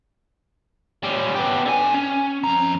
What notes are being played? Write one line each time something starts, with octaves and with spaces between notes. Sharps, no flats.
G3 C#4
B3 G4
D3 G#5
C#4
F2 A#5